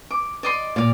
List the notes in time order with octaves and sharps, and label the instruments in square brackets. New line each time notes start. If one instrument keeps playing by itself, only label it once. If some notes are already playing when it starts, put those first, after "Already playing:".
[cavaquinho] D6
D5 D#5 C6
[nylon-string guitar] A#2 [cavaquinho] D5 F5